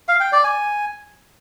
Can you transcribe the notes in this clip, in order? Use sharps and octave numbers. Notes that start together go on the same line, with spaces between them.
F5
G5
D5
G#5